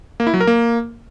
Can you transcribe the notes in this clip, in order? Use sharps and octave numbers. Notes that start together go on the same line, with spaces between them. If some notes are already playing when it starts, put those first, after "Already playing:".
A#3
E4
F#3
A#4
A#3